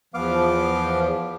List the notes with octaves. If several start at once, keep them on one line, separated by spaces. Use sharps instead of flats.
E2 F3 B3 F5 D6